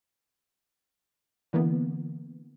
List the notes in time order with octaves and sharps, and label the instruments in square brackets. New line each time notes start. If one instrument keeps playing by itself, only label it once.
[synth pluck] D3 E3 A#3 B3